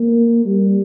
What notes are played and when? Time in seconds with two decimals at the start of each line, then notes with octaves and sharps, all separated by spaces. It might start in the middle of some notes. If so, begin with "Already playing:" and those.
Already playing: A#3
0.45 G3